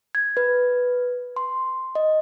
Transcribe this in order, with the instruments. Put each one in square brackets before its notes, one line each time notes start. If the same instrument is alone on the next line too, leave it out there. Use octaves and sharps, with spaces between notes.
[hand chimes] G#6
B4
C6
D#5